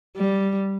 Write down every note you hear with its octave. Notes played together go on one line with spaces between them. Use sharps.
G3